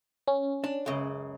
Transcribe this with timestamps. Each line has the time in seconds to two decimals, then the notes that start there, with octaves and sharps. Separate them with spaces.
0.28 C#4
0.64 D4
0.86 C#2 F#2 C#3